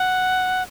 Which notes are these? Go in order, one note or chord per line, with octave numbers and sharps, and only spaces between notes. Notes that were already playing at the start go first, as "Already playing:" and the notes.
Already playing: F#5